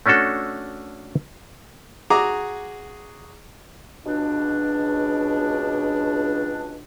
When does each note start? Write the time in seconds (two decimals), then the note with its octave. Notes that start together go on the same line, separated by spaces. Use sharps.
0.06 A3 C#4 D4 F#4 A4
2.10 F#4 G#4 A#5 D6
4.06 C#2 B2 D4